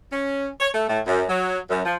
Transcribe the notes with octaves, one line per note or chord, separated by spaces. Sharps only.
C#4
C#5
A3
A2
F#2
F#3
F#2
F3